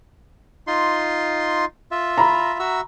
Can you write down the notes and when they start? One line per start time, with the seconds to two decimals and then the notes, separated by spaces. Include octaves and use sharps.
0.67 D#4 F4 C6
1.91 F4 E5
2.18 A#5 B5
2.59 F#4 E5 E6